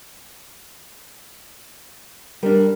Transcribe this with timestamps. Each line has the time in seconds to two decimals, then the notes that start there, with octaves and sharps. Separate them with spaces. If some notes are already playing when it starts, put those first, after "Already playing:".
2.43 G3 D4 A#4